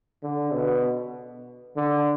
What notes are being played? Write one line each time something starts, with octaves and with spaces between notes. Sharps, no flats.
D3
B2
D3